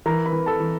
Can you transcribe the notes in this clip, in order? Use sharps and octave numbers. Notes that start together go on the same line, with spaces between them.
E3 A#4 A#5
B4 B5
E3
A4 A5
E3